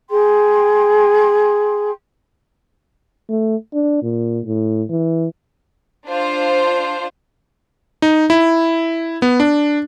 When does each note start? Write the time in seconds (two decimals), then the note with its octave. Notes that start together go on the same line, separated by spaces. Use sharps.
0.09 G#4 G5 C6
3.29 A3
3.73 D4
4.02 A#2
4.45 A2
4.90 E3
6.06 D4 F4 C5
8.02 D#4
8.30 E4
9.22 B3
9.40 D4